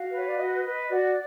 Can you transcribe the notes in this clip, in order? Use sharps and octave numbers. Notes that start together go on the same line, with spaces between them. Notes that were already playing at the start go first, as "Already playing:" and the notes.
Already playing: F#4 F5
B4
C#5
D5
F#4 D#5
B4
F#4 D5